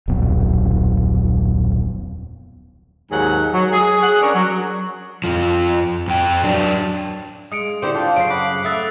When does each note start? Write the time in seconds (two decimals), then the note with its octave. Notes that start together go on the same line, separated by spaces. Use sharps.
0.08 D#1 B1 F2 B2
3.11 D#2 G#2 F#3 G#4 F#5
3.53 F#3
3.72 G#4
4.02 G#4 F#5
4.21 C#4 D4 A#4 C#5
4.34 F#3
5.24 F2 F3
6.08 F2 G5
6.43 F#3 D4
7.52 G#3 D#6 C#7 D7
7.82 D3 C4 E4 G4 C5
7.95 D4 F4 G5
8.16 F#2 C#3 C5 C7 D7
8.30 F#5 B5 D6
8.65 A3 E5 D#6 F#6 A6